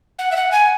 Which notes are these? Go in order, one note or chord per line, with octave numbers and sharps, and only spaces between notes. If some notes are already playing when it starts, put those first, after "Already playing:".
F#5
E5
F#5
G#5